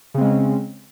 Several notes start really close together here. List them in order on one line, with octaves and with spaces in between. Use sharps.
C#3 C4 G#3 C#4